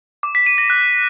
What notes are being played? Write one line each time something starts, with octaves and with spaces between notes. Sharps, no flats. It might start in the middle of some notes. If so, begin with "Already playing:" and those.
D6
B6
D#7
A#6
F#6